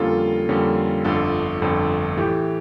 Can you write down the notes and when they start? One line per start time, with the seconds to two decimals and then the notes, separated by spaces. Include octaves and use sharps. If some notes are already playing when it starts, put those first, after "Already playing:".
Already playing: F2 D3 G3 A#3 C#4 F4 A4
0.49 F2 D3 G3 A#3 C#4
1.04 G1 F2 D3 F4 A4
1.61 G1 F2 D3
2.17 A2 E3 A3 G4